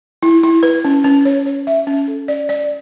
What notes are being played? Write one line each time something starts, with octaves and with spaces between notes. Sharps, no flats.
E4
E4
B4
C#4
C#4
C#5
C#5
E5
C#4
A4
D5
D5